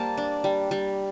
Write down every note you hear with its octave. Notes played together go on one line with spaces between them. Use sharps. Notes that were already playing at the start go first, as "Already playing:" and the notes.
Already playing: G3 A#3 C5 A5
D4
G3
G3